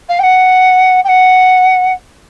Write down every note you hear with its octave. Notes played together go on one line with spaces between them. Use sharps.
F5
G5
F#5
G5
F#5